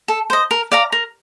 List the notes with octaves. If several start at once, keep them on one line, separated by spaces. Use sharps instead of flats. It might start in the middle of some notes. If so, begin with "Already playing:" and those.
A4
C5 D#5
A#4
D5 F5 A#5
A#4